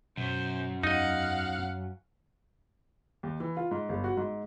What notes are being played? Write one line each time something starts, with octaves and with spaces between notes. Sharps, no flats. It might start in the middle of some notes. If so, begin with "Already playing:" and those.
F#2 B2 C5
E2 D#4 D#5 F5 F#5
D#2
E3
F4
G#2
G1
F#4
G#2